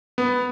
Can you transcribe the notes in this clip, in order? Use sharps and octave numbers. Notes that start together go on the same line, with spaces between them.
B3